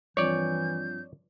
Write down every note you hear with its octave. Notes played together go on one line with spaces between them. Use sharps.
G2 E3 F3 C4 C#5 D5 G6